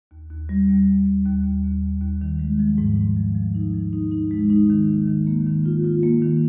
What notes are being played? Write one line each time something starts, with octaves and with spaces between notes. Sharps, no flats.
D#2
D#2
G3
D#2
D#2
D#2
D#2
D#2
D#2
D#2
D#2
D#3
G#3
F3
G#2
G#2
F3
F3
D#4
F3
D#4
D#4
G#3
D#4
D#3
A#3
D#3
A#3
D#3
F4
F4
A#3
D#3